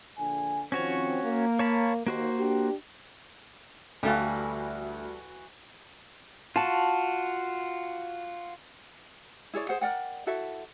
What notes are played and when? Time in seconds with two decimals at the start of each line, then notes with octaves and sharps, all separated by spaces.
0.18 A#1 D3 G#5
0.72 D#3 F3 C4 C#4 F#4 C#5
1.24 A#3
1.59 C#5 A5 B5
2.07 D#2 A#3 F#4 C5
2.38 D4 G4
4.03 D2 E3 G3 F#4 A4 F5
6.56 F4 F#4 A5
9.54 E4 G#4 C#5 D5
9.69 G#4 C5 F#5
9.81 A#4 D5 F#5 G5
10.27 E4 F#4 A4 E5